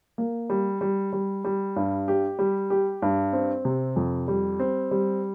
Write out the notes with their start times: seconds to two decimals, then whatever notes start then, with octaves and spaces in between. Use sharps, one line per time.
0.18 A#3
0.50 G3
0.81 G3
1.13 G3
1.45 G3
1.76 G2
2.08 G4
2.39 G3
2.70 G4
3.02 G2
3.33 C4
3.65 C3
3.96 F2
4.28 G3
4.60 C4
4.91 G3